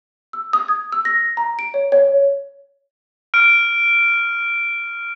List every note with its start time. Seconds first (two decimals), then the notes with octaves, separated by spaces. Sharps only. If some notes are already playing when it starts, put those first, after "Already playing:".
0.33 E6
0.53 D#6
0.68 G#6
0.92 E6
1.05 A#6
1.37 A#5
1.59 D7
1.74 C#5
1.92 C#5
3.34 F6 D7